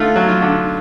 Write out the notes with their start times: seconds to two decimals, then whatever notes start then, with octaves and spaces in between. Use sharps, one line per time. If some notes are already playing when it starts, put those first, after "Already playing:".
Already playing: D3 A3 F4
0.16 F#3
0.29 F4
0.42 D3